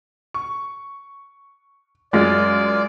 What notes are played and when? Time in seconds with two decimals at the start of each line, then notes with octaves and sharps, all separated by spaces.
0.34 C#6
2.13 F#2 G#3 F4 D5 A6